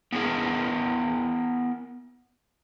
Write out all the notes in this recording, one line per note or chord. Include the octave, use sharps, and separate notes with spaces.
B3 E4 G4 G#4 A#4